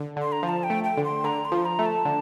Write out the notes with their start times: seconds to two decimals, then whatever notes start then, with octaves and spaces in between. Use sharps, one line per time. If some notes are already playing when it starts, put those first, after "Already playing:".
Already playing: D3
0.16 D3
0.22 C6
0.32 A#5
0.43 F3 A#5
0.49 A5
0.63 G5
0.70 A3
0.84 G5
0.97 D3
1.04 C6
1.24 D3 A#5
1.45 C6
1.52 F3
1.65 A#5
1.79 A3
1.86 A5
2.05 D3